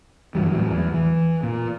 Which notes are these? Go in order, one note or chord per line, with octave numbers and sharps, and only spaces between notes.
G2 E3 F#3 G3
A2 E3 F#3 G3
E2
E3
A#2